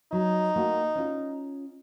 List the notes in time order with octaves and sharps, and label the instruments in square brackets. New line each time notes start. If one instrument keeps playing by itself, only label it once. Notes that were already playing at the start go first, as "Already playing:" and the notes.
[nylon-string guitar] F#3 [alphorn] D#4
[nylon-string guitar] A3 A#3 F#4
C#4 F4